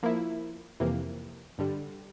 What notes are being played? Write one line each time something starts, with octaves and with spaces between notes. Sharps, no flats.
F3 A#3 E4
F2 C3 E3 A#3
G2 D3 G3